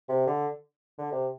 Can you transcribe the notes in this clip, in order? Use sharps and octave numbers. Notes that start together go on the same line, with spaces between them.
C3
D3
D3
C3